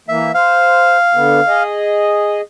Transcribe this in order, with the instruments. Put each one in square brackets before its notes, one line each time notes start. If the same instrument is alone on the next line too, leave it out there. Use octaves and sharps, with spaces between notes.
[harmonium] E3 A#3 [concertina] E5
[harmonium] C5 [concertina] F5
[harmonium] D3 B3
G#4 D#5